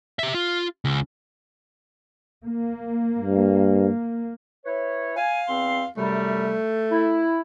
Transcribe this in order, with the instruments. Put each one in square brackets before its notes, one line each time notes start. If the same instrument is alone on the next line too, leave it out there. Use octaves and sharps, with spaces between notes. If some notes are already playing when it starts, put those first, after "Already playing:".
[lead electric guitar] G4 E5
F4
C#2
[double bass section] A#3
[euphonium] G2
[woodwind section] E4 B4 C#5
[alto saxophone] F5 [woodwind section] G#5
[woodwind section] E2 C4 C6
[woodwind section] F#2 C3 G3 [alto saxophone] A3
[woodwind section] E4